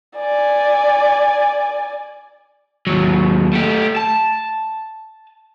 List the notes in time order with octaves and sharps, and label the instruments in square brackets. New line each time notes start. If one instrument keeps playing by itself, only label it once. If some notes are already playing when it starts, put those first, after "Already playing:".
[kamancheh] D5 G#5
[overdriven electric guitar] D#2 F#3
A3 G4
A5